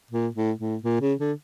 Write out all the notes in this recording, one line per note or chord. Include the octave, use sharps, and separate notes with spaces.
A#2
A2
A2
A#2
C#3
D3